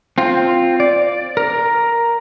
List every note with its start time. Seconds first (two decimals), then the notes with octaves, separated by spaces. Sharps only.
0.18 C4 F4
0.80 D5
1.37 A#4